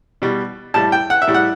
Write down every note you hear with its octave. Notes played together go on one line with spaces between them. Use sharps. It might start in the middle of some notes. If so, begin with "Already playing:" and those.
B2 G3
A2 G3 A5
G5
F#5
E5
A2 G3
F#5